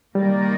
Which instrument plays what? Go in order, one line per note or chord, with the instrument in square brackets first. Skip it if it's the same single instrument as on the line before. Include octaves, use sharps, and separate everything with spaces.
[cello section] D#3 A#3 D#4 A#4 D5 [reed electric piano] G3